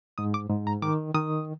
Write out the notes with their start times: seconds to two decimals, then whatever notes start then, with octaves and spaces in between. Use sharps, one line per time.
0.18 G#2 D#6
0.34 D6
0.50 G#2
0.67 A#5
0.82 D#3 D6
1.14 D#3 D#6